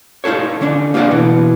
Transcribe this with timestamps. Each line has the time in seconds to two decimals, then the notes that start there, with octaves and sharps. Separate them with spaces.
0.24 D#4 F4 G#4 A4 C#5
0.61 D3 C#4 D4
0.94 A#3 F4 G#4 A#4 D5 F#5
1.11 B2 E3 B3